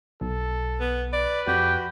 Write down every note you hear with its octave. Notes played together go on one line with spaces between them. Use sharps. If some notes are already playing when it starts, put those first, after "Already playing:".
B1 A4
B3
B4 D5
F2 F#4 G4